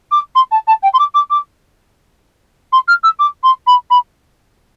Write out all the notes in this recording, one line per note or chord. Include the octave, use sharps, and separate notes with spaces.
D6
C6
A5
A5
G5
C6
D6
D6
D6
C6
F6
E6
D6
C6
B5
B5